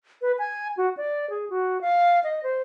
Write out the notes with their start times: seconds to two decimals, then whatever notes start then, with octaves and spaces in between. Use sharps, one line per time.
0.22 B4
0.39 G#5
0.77 F#4
0.97 D5
1.30 G#4
1.50 F#4
1.81 F5
2.24 D#5
2.43 C5